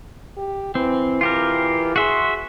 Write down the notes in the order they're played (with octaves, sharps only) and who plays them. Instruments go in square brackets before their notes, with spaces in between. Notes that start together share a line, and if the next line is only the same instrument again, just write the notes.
[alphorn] G4
[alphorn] E3 [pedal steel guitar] C4
[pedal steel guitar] F4 G4 A#4
[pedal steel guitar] F#4 E5 C6 [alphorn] G#4